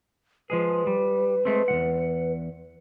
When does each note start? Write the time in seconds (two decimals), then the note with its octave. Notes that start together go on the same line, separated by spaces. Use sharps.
0.50 F3 G#3 G#4 B4
0.87 G3
1.45 G#3 A3 C4
1.68 E2 D#3 F#5